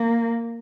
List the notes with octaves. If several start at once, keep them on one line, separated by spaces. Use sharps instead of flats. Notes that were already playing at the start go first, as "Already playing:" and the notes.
Already playing: A#3